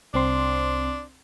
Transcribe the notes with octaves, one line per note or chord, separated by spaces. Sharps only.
C2 C4 D4 C6